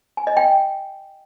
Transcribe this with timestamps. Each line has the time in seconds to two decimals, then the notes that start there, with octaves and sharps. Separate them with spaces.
0.17 G#5
0.27 D#5
0.37 G5